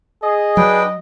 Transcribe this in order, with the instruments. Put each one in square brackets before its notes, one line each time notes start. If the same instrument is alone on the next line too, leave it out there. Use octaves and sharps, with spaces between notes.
[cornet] G#4 [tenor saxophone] D#5
[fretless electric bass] F#3 [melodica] D4 B4 G5